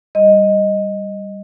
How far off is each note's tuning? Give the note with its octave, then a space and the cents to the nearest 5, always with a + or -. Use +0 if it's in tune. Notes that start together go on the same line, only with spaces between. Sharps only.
G3 +0 D#5 +0